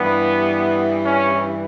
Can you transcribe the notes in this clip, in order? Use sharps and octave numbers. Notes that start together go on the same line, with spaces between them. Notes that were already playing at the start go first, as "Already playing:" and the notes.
Already playing: G2 E3 B3
C#4